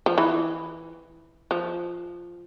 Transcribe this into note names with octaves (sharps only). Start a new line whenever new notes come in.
F3
E3
F3